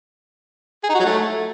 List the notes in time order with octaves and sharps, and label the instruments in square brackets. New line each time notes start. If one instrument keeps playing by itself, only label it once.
[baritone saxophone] G#4
D#4
F#4
F#3
A3